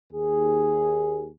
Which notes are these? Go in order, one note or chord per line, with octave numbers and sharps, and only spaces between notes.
D#2 G#4